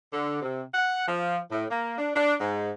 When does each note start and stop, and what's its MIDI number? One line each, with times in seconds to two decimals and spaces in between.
0.12 0.41 50
0.42 0.63 48
0.74 1.08 78
1.08 1.38 53
1.51 1.65 45
1.70 1.97 58
1.98 2.11 62
2.16 2.34 62
2.41 2.70 44